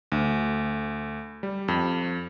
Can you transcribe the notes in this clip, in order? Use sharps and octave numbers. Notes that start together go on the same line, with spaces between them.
D2
G3
F2